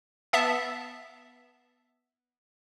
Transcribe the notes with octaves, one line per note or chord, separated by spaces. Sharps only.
B3 E5 A5